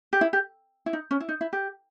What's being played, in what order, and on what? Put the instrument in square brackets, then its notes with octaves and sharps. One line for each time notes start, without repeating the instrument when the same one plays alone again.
[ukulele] G4
E4
G4
E4
D#4
C#4
E4
D#4
E4
G4